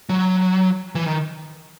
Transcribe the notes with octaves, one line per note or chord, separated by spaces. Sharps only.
F#3
E3
D#3